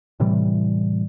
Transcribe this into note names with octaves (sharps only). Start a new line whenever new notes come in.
A2 C3 E3 G3